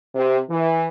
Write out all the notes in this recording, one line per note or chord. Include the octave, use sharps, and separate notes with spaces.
C3
E3